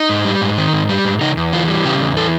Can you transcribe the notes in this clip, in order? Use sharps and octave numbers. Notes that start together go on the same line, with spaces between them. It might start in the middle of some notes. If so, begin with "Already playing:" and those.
Already playing: D#4
G#2
G3
G#2
D#3
G#2
G3
G#2
C#3 D#4
E2
E3 F4
G3
C#3 G4
E2
E3 A4